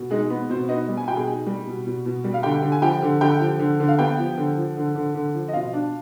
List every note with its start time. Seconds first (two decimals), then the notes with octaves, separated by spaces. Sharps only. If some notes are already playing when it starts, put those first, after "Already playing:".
Already playing: B2
0.11 G#3 D#4 G#4
0.30 B3
0.49 B2 C4 C5
0.69 B3 D#4 D#5
0.88 G3
0.97 G#5
1.08 B2 G5
1.16 G#4 G#5
1.28 D#4
1.46 G3
1.67 B2
1.86 B2
2.06 B2
2.24 G3
2.34 F5
2.43 D3 G4 G5
2.62 D3
2.72 G#5
2.82 F3 G4 G5
3.02 D3
3.21 D3 G4 G5
3.40 F3
3.59 D3
3.80 D3
3.88 F5
3.98 B3 G4 G5
4.18 F3
4.37 D3
4.57 F3
4.77 D3
4.95 D3
5.15 D3
5.34 F3
5.48 D#5
5.53 B2 F4 F5
5.73 D4